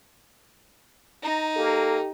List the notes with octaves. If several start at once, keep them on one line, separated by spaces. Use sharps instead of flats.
D#4 A#5
A#3 G4 A4